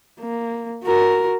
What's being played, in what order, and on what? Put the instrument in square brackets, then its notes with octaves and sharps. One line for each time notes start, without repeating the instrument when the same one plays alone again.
[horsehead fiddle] A#3
F#4 A#4